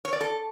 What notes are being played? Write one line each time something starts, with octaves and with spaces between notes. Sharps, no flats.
C#5
D5
A4